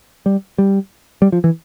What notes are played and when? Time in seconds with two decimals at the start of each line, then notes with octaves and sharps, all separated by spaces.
0.26 G3
0.58 G3
1.22 G3
1.32 F3
1.44 E3